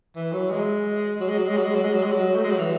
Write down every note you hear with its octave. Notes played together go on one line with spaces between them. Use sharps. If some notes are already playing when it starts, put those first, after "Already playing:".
E3
F#3
G#3
F#3
G#3
F#3
G#3
F#3
G#3
F#3
G#3
F#3
G#3
F#3
A3
G#3
F#3
E3